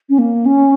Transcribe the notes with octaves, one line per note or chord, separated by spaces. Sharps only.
C#4
A#3
C#4